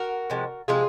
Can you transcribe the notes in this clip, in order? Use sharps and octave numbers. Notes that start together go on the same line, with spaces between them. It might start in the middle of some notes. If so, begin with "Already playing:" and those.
Already playing: F#4 A#4
C3 F3 G#3
C3 F3 G#3 F4 G#4